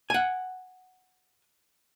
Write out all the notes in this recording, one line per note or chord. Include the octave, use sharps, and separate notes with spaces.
F#5 G#5